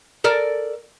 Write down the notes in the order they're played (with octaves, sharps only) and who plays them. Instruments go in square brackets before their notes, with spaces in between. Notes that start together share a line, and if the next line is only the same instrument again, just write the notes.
[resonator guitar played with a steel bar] A4 A#4 D5